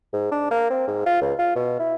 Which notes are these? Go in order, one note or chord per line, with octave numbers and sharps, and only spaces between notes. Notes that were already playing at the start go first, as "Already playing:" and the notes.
G#2
D4
A#3
C4
G#2
F4
C#2
F4
B2
E4